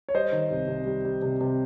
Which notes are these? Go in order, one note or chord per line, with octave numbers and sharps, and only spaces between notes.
C#5
G3 C5 D#5
D#3
C2
C3
G3
G3
C3
C3